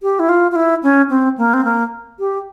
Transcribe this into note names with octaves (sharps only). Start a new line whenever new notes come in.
G4
E4
F4
F4
E4
C#4
C4
A#3
C4
A#3
G4